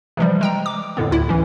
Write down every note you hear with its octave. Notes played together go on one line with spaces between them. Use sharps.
C3 E3 F3 G3
G#3 G5 A#5
D6
F2 A2 D3 B3
D2 E4
E3 C#4